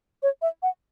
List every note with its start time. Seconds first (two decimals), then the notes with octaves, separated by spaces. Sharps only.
0.23 C#5
0.42 E5
0.63 F#5